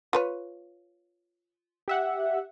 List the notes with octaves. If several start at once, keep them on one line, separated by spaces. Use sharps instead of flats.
F4 B4 C#5
G4 E5 F#5